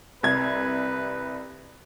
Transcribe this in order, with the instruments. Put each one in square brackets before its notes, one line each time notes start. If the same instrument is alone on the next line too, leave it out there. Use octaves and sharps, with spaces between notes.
[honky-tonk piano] C2 G#6 [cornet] B4